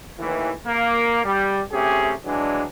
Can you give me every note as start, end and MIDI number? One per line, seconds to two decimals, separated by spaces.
0.19 0.51 39
0.19 0.51 45
0.19 0.51 52
0.66 1.22 58
1.24 1.61 55
1.72 2.13 48
1.72 2.13 57
1.72 2.13 61
1.72 2.13 67
1.72 2.13 68
2.25 2.64 52
2.25 2.64 54
2.25 2.64 56
2.25 2.64 62